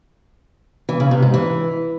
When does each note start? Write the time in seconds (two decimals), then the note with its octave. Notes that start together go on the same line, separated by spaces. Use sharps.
0.89 E3
1.00 C#3
1.11 C3
1.22 G#2
1.34 E3